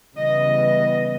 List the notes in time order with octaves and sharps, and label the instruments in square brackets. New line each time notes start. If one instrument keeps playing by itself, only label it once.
[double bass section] C#3 E3 G3 B3 [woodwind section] D#5